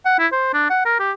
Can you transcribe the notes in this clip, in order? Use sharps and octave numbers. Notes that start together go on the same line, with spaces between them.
F#5
E4
C5
D4
F#5
A#4
G4